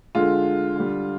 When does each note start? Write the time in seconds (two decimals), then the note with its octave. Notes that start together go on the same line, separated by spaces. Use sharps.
0.15 D3 G#3 F4
0.76 D3 G3